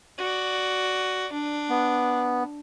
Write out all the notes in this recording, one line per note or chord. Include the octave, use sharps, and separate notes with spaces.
F#4 D5
D4
B3